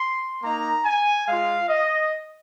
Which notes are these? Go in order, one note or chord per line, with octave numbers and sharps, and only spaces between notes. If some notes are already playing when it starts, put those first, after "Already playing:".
Already playing: C6
A#3 D#4 A#5
G#5
G#3 F4 F5
D#5